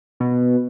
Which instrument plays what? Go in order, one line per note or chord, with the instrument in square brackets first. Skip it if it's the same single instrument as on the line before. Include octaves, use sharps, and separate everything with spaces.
[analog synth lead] B2